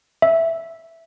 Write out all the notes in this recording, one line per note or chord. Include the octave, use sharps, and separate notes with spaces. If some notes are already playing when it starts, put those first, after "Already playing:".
E5